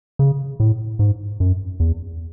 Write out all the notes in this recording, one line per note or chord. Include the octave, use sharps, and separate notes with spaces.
C#3
A2
G#2
F#2
E2